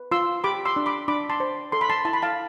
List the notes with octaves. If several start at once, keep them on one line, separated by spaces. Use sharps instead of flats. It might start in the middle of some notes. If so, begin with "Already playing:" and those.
Already playing: B4
F4 C6 E6
G4 B5 D6
C6 E6
D4
B5 D6
D4 B5 D6
A5 C6
C5
A4 C6
B5
A5 C6
E4 A5
B5
F5 A5